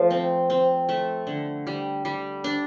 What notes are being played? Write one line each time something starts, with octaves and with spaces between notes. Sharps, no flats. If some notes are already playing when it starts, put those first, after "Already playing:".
Already playing: F3 A3
C4
C4
A3
D3
G3
G3
D4